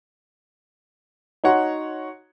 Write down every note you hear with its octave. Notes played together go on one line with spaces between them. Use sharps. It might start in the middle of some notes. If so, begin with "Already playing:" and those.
D#4 F#4 C#5 F#5 A#5 C6